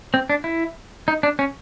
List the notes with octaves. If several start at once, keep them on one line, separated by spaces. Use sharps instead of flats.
C4
D4
E4
D#4
D4
C#4